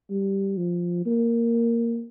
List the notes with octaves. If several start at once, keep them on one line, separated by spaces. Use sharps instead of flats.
G3
F3
A#3